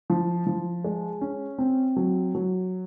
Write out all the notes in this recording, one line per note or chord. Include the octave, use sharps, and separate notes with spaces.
F3
F3
G#3
C#4
C4
F#3
F#3